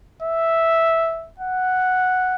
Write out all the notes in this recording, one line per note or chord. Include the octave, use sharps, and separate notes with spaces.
E5
F#5